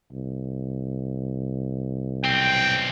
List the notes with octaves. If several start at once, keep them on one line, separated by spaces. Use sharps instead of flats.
C2
B1 C4 G5